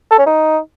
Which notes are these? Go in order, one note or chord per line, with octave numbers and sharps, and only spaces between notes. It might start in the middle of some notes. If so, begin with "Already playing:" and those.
A4
C#4
D#4